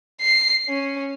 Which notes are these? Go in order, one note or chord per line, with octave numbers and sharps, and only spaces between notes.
C7
C#4